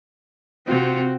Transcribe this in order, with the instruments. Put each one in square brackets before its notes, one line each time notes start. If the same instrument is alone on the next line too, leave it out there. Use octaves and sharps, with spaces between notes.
[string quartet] C3 F4 [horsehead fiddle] C4 F#4